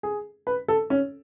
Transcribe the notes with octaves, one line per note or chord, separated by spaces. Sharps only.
G#4
B4
A4
C#4